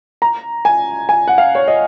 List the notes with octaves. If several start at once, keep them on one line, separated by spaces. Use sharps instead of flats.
A#5
G#5
G#5
F#5
F5
C#5
D#5